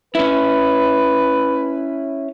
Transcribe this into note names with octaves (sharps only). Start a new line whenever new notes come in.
C#4 E4 B4